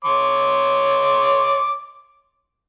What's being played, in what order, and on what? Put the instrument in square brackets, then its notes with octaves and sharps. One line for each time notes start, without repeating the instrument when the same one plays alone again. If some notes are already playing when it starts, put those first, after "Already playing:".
[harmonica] C#5 C6 D6